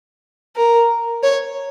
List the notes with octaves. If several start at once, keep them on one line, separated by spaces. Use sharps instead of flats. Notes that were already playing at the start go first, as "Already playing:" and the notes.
A#4
C#5